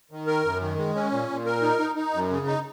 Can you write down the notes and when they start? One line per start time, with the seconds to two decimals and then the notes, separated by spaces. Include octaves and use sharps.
0.11 D#3
0.27 A#4
0.45 F#2
0.61 D#3
0.78 G#3
0.95 C#4
1.12 A#2
1.29 A#2
1.46 A#4
1.62 D#4
1.79 D#4
1.96 D#4
2.13 F#2
2.30 C#3
2.47 D#4